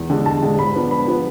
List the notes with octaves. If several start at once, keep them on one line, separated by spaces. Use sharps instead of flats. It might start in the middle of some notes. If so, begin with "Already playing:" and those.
Already playing: E2
D3 G#3
E2 A5
D3 G#3
G#2 B5
F3 B3 D4
G#2 B5
F3 B3 D4